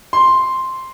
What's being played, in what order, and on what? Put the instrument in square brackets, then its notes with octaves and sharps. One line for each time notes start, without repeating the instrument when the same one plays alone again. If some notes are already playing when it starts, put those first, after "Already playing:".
[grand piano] C6